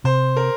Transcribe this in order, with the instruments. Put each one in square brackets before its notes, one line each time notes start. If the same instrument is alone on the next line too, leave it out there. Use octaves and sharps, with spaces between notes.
[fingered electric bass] C3 [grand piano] C5
[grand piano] A#4